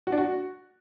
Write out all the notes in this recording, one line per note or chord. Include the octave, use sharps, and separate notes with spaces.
F#4
D4
F#4